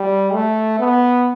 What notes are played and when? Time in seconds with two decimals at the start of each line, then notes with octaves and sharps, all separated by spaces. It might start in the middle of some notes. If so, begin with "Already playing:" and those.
Already playing: G3
0.33 A3
0.80 B3